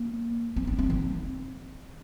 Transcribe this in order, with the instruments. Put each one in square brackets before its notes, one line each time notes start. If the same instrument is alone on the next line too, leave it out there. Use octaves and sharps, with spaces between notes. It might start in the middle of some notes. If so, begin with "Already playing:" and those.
Already playing: [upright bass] A#3
C4
D4
C4
D#3